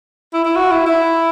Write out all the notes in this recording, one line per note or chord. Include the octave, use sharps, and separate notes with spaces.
E4
E4
F#4
E4
E4